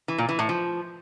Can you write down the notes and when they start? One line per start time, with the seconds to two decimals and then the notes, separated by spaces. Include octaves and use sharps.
0.08 E3
0.18 A#2
0.29 E3
0.39 A2
0.49 F3